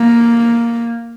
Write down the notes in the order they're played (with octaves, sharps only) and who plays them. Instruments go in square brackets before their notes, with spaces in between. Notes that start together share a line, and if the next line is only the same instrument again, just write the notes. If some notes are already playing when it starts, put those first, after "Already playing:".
Already playing: [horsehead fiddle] A#3